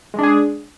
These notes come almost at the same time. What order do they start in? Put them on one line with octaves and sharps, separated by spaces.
G#3 D4 G#4